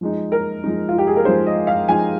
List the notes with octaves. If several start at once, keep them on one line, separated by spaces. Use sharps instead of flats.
F3 G#3 D#4
A#4
F3 G#3 D#4
F4
G4
G#4
A#4
F3 G#3 D#4 C5
D#5
F5
F3 G#3 D#4 G#5